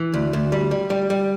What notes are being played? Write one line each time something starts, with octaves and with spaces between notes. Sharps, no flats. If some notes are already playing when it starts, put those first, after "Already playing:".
Already playing: E3
D2
D2
G3
G3
G3
G3